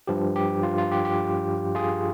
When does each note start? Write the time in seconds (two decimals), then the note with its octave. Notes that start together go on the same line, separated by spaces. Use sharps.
0.07 G2 F3 G4
0.36 G4
0.63 F4
0.78 F4
0.92 G4
1.05 G4
1.75 F4 G#4